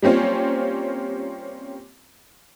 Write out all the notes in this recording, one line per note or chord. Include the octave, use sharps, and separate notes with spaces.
G3 A#3 C4 C#4 F4